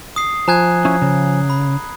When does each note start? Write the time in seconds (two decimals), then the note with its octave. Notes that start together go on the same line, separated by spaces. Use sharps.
0.16 D#6 C7
0.48 F3 G#5 A#5 F#6 G#6
0.85 C#4 E4
1.02 C#3
1.50 B5